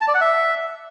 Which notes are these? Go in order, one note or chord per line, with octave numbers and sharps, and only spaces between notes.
A5
D5
F#5
E5